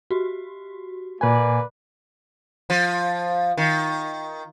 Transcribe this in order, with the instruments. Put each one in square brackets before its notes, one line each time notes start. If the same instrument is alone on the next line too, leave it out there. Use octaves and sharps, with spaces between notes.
[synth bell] F#4 G4
[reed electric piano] A#2 G#5 [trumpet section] A#3 B4 D5
[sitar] F3
D#3